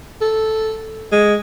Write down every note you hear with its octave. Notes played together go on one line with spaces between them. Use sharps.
A4
G#3